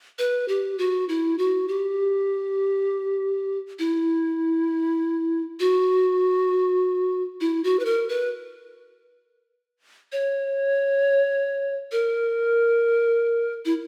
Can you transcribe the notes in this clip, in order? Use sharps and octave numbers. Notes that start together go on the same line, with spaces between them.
B4
G4
F#4
E4
F#4
G4
E4
F#4
E4
F#4
B4
A#4
B4
C#5
A#4
E4